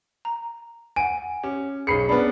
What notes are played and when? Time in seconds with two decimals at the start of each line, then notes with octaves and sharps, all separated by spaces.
0.25 A#5
0.96 F#5 G#5 D7
1.44 C#4 G4
1.87 B1 G#4 B5 C7 C#7
2.09 B3 C#4 D4 B5